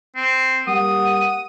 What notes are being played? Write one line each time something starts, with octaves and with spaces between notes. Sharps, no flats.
C4
G3 A#3 F#5 D#6